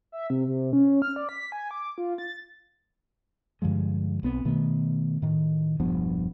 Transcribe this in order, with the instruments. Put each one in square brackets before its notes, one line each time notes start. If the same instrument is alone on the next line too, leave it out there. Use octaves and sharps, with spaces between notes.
[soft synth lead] E5
C3
C3
C#4
F6
D5
B6
G#5
D6
F4
A6
[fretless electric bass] G2 D3 F3 G#3
B1 B3 C4
B2 D#3 A3 B3
A2 D#3
E1 G2 F3 B3